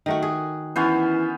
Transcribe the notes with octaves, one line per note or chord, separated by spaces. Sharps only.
D#3 A3 F#4
G#4
E3 B3 C#4 C5